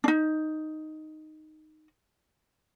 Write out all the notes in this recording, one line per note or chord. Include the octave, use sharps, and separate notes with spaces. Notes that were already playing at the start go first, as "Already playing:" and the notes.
D4 D#4